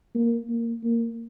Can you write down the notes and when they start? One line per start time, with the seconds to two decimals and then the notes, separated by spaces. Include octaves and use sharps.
0.15 A#3
0.50 A#3
0.84 A#3